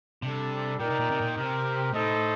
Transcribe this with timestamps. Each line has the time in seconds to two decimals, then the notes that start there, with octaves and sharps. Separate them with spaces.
0.22 C3 G3 D4 A4
0.80 A#2 D#4 A#4 D5 G5
0.90 C3
1.00 A#2
1.11 C3
1.21 A#2
1.37 C3 C4 G4 A#4
1.94 A2 D#4 A4 C5 D#5